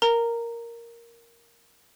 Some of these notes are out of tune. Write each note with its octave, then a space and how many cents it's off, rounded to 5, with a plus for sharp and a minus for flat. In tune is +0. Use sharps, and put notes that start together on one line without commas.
A#4 +0 A#5 -10